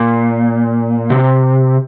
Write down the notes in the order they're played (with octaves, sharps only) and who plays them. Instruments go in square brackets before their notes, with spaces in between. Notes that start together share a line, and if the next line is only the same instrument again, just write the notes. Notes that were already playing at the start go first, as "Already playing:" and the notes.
Already playing: [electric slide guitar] A#2
C3